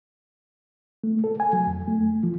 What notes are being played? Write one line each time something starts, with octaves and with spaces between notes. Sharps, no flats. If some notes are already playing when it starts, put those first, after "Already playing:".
A3
A4
G#5
F#3
F2
A3
F3